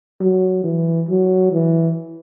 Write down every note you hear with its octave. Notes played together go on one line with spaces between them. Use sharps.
F#3
E3
F#3
E3